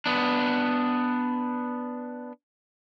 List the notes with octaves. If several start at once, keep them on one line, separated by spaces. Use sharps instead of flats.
B3 D4